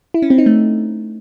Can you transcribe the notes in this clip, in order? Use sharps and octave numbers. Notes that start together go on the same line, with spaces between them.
E4
C#4
C4
D#4
A3